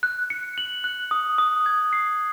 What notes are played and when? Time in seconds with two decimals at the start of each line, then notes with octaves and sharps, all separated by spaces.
0.03 F#6
0.30 C#7
0.58 F#7
0.84 F#6
1.11 D#6
1.38 D#6
1.66 G#6
1.93 C7